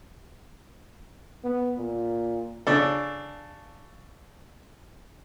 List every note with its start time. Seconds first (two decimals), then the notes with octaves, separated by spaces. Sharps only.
1.44 B3
1.78 A#2
2.67 C#3 D4 A4